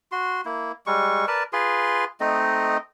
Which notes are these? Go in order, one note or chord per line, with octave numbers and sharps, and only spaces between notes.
F#4 C6
A#3 E4
G3 G#3 C#6
A#4 B4 D5 A5
F4 G#4 B4 C6
A3 C4 D#4 D#5